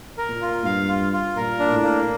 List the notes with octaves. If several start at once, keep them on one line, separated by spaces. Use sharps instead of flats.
A#4
A#2
F4
G2 F5
F4
F4
A#2 A#4
D4
A2
A#3